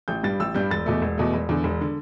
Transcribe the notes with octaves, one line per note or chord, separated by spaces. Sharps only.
A1 G6
G2 G3 A6
A1 E6
G2 G3 G6
E1 A6
E2 B2 A3
E1
E2 B2 A3
E1
E2 D3
E1
D3